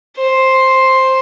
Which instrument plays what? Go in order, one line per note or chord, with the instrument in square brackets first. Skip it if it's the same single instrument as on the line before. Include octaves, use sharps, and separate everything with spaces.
[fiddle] C5